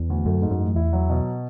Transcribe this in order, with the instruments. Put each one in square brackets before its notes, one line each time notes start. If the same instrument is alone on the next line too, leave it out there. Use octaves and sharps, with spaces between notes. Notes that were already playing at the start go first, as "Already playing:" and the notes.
Already playing: [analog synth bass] E2
[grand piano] D2
[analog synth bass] F#2 [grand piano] A3
[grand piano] G#2
[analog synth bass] F#2
[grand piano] A1
[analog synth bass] E2 [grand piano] E4
[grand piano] F#3
B2